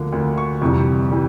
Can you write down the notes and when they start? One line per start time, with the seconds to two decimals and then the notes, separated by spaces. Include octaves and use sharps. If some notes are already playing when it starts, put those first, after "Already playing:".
Already playing: D2 D3 F3 A#3
0.12 D2 D3 F3 A#3
0.38 C#6
0.62 F2 C3 E3 G3
1.11 E3 G3